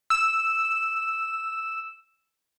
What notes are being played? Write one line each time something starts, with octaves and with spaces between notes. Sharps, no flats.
E6 E7